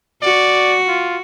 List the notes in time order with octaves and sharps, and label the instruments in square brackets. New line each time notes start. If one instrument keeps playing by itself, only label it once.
[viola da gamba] F#4 [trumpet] D5
[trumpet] F4